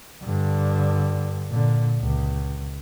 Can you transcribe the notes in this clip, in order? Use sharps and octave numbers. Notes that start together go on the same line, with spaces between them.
G2 D3
A#2 D3
C#2